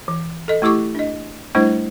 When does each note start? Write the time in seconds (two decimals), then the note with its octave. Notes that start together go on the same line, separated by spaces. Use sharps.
0.08 E3
0.48 A4 D#5
0.62 A3 E4 G4 C#6 D6
0.95 D4 D#5
1.55 G3 A3 D4 E4 C5